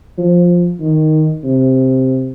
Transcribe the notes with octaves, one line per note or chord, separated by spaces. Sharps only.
F3
D#3
C3